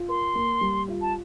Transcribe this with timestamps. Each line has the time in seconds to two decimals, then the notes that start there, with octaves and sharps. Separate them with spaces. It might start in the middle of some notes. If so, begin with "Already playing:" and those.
Already playing: F4
0.08 A#4 C6
0.35 A#3
0.61 G3
0.88 F4
1.02 A5